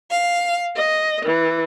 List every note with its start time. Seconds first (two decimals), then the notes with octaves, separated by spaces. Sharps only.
0.10 F5
0.76 D#5
1.25 E3